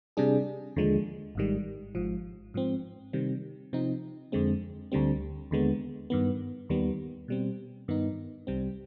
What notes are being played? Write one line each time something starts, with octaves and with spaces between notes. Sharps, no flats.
C3 G3 D4 G#4
D#2 D3 F3 G#3
G#1 G#2 D#3 G3
G#1 G#2 F3
G#2 F3 C4
C3 D#3 G3 C4
C3 F3 C4 D#4
F2 D3 G#3 C4
D2 D3 G3 C4
D#2 D3 G#3 B3
G2 D#3 B3
D#2 D#3 G3 B3
B2 G3 C4
G2 D#3 B3 D#4
C2 C3 G3 C4